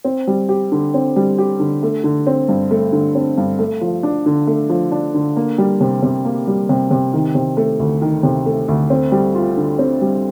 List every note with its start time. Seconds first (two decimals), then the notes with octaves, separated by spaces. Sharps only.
0.05 C4
0.27 G3
0.49 G4
0.72 D3
0.94 C4
1.16 G3
1.38 G4
1.60 D3
1.83 A3
2.04 D3
2.27 C4
2.49 G2
2.71 A3
2.92 D3
3.15 C4
3.38 G2
3.59 A3
3.81 F3
4.03 D4
4.26 D3
4.47 A3
4.70 F3
4.92 D4
5.14 D3
5.37 A#3
5.58 G3
5.81 C3
6.03 C3
6.25 A#3
6.47 G3
6.69 C3
6.91 C3
7.14 D#3
7.35 C3
7.57 A3
7.79 D2
8.02 D#3
8.23 C3
8.46 A3
8.68 D2
8.90 C4
9.12 G3
9.35 F4
9.57 D3
9.79 C4
10.01 G3